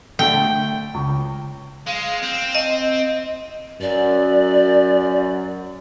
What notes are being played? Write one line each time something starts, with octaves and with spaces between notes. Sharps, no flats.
D3 A3 G5
C#2
G#3 F5
C4
D#5
F#2 D5